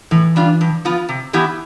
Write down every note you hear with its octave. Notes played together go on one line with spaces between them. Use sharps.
A2 E3
G3 D4 F4
G2
F3 B3 F4
C3
E3 B3 E4 G4